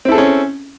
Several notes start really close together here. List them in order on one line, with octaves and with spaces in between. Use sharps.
C4 E4 A4 G#4 C#4